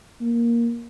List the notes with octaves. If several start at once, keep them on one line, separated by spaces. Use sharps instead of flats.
A#3